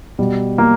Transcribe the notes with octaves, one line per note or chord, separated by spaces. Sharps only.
B2 G3
A#3